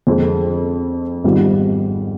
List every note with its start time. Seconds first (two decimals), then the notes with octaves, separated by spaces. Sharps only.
0.07 F2 D3 G#3 C4
1.24 G#1 G#2 G3 B3 F4